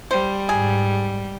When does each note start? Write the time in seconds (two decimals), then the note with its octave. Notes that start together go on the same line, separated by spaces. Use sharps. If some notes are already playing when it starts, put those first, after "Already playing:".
0.11 G3 C5
0.49 G#2 G#4